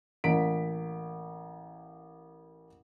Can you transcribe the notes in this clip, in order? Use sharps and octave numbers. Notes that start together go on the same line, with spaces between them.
A1 A#3 B6 D7